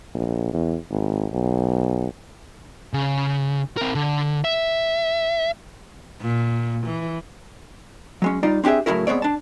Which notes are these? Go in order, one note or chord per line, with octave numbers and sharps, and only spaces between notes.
A#1
E2
G#1
B1
C#3
C4 A#4
D3
E5
A#2
E3
F#3 G#3 C#4
G3 D#4 F4 D5
C4 D4 G4 G#4 E5
A2 C#3 E3 F#3 E4 A#4
G#3 B3 C4 C#5 D5
D4 A5